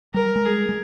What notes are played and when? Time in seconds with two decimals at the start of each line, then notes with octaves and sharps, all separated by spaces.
0.14 G3 A#4
0.36 G#3
0.46 G#4
0.69 G#3